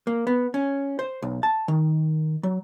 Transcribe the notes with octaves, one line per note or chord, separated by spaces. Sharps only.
A#3
B3
C#4
C5
B1
A5
D#3
F#3